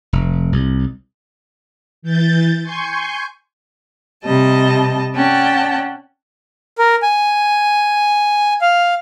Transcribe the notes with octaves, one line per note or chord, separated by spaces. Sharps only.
F1
C2
E3 G6 A6
G#5 C6 C#6 G6
C3 G3 D#5 A5
C#4 D5 F#5 G5 A5
A#4
G#5
F5